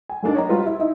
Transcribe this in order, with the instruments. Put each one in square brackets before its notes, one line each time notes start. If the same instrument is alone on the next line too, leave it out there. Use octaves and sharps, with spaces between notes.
[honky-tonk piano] G#5
F#3 A3 A#3 D4 D#4
C#5 D#5 A#5
G3 F4 F#4 B4
E4
D#4 E4